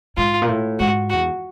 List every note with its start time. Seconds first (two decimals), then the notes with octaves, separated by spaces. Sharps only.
0.17 G#2 F4
0.42 A#2
0.48 A2
0.80 G#2 F#4
1.10 E2 F#4